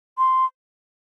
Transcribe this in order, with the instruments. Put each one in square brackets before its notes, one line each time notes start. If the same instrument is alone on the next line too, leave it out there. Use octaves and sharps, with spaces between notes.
[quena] C6